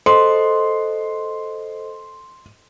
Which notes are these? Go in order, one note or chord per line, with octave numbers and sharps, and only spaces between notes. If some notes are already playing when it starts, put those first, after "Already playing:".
A4 C5 D#5 C6